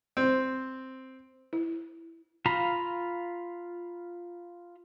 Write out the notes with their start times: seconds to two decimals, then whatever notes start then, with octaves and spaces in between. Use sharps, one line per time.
0.17 C4
1.53 E4
2.46 F4 F5 A#5 B5